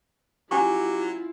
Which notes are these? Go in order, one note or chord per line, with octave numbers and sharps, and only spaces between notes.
F#3 C#4 E4 F4 G4 G#5 C#6